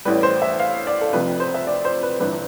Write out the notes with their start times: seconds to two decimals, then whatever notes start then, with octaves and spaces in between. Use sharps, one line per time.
0.05 A1 A2 E3 G3 B4
0.23 C5
0.42 E5
0.60 F5
0.87 D5
1.01 A4
1.13 F1 F2 C3 B4
1.40 C5
1.54 E5
1.67 D5
1.85 C5
2.03 B4
2.20 G1 G2 E3 B4